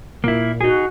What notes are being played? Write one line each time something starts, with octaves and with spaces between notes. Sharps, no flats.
A#2 A#3 E4
D#4 F#4 G#4